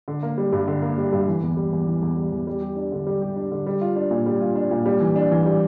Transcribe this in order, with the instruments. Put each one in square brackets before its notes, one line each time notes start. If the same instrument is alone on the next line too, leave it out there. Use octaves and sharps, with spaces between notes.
[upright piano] D3
A#3
G3
G2
D3
A#3
G3
G2
E3
E2
G3
E2
E3
E2
G3
E2
G3
G4
D4
D3
G3
G4
D4
D3
G3
F4
D4
A#2
G3
F4
D4
A#2
G3
E3
D4
E3
G3